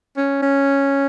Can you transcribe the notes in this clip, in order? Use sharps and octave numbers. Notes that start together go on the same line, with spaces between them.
C#4
C#4